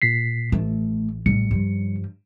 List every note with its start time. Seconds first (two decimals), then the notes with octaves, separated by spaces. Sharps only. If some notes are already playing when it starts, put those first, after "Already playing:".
0.02 A#2 B6 C7
0.52 A1 A3
1.26 A#1 A2 G3 C#7
1.51 G2 F3